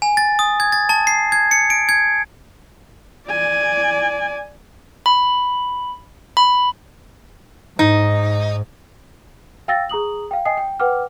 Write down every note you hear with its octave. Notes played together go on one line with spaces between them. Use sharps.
G#5
A6
D#6
G#6
A6
A5
C7
G#6
C#7
D7
G#6
D5 G#5
B5
B5
G#2 D#4
F5 G5 E6 A6 A#6
G#4 A#5 D#6 F#7
F5 G5
D#5 G5 G#5 D#6 C7
G5
B4 F#5 G5 D6 F6